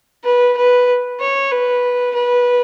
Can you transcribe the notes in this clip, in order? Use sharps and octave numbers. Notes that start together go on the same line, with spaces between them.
B4
B4
C#5
B4
B4